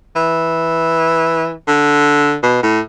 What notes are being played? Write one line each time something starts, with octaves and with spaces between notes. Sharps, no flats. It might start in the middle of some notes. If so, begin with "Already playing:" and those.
E3
D3
B2
A2